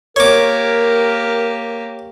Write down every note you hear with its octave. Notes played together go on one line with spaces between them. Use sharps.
A#3 G4 A#4 C#5 D6